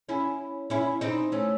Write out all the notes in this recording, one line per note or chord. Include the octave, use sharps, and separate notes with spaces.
C#4 E4
C#4 E4
C4 D#4
A3 C#4